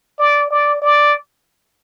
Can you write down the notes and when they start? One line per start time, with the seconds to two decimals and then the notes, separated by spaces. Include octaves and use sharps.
0.19 D5
0.50 D5
0.82 D5